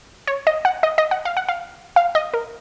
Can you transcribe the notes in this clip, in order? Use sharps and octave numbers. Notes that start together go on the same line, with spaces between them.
C#5
D#5
F#5
D#5
D#5
F#5
F5
F#5
F5
F5
D#5
A#4